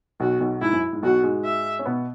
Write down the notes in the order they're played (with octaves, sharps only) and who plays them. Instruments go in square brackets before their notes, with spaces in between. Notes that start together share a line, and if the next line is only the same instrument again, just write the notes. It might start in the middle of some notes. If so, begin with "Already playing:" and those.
[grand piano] B1 B2 [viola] F#4
[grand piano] B1 B2
[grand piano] G#2 [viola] E4
[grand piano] F#2
G#2
[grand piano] B1 B2 [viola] F#4
[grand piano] G#2 G#3
[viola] E5
[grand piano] C#4
B2 B3